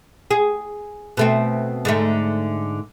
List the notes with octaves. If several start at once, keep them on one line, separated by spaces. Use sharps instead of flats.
G#4
B2 A3 C4
G#2 D3 A3